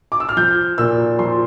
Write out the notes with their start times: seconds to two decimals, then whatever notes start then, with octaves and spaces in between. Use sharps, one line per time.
0.12 D6
0.20 E6
0.29 F6
0.37 F3 G6
0.78 A#2 E6
1.19 F3 C6